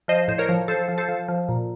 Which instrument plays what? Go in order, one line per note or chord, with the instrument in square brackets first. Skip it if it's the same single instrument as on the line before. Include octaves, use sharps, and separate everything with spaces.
[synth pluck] F3 C5 D#5
A2 C5
A#4 C#5
F3
F3 A4 C5
F3
A4 C5
F3
F3
A#2